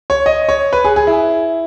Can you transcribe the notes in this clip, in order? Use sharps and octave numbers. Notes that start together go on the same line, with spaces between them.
C#5
D#5
C#5
B4
G#4
G#4
E4